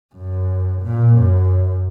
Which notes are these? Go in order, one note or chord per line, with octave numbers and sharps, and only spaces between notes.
F#2
A#2
F#2